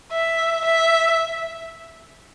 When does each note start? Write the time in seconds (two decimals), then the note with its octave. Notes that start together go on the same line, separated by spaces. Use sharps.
0.12 E5
0.64 E5